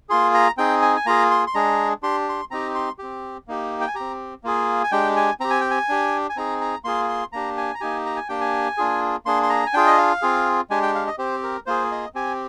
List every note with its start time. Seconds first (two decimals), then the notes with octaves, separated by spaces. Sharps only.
0.09 A#3 F4 G#4 C6
0.34 A#5
0.57 C4 D#4 G#4 G5
0.82 G#5
0.97 G#5
1.06 A#3 F4 G#4 A#5
1.31 C6
1.47 C6
1.55 G#3 D4 G#4 A#5
2.03 D4 G4 C6
2.29 C6
2.51 C4 D#4 G4 A#5
2.75 C6
2.99 C4 G4
3.48 A#3 D#4 G4
3.81 G5
3.88 G#5
3.95 C4 G4 A#5
4.44 A#3 F4 G#4
4.84 G#5
4.91 G#3 D4 G4 G5
5.17 G#5
5.40 C4 G4 A#5
5.50 G#5
5.61 G5
5.71 G#5
5.89 D4 G4
6.30 G#5
6.36 C4 D#4 G#4 A#5
6.61 A#5
6.84 A#3 F4 G#4 C6
7.09 C6
7.33 A#3 D4 G4 A#5
7.57 G#5
7.75 A#5
7.81 A#3 D#4 G4 G#5
8.06 A#5
8.16 G#5
8.29 A#3 D4 G4 G5
8.41 G#5
8.78 A#3 D4 F4 G#4
9.26 A#3 D4 G#4 C6
9.43 C6
9.50 A#5
9.66 G#5
9.74 D4 F4 G#4 G5
9.87 D#5
9.98 F5
10.22 C4 F4 G#4
10.70 G#3 D4 G4 G#5
10.83 G5
10.95 F5
11.07 D#5
11.18 C4 G4 C5
11.43 A#4
11.66 A#3 F4 G#4 C5
11.91 D#5
12.15 C4 G4 G#5